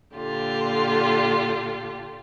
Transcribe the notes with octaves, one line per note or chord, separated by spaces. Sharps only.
A#2 D3 F4 G4